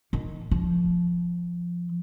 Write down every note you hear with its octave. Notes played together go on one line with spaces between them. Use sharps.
D#3
F3